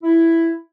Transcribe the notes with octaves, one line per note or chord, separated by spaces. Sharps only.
E4